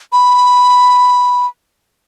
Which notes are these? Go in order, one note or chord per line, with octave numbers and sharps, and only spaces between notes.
B5